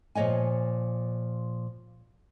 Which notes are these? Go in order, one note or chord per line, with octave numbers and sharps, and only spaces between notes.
A#2 F3 C#5 D#5 G#5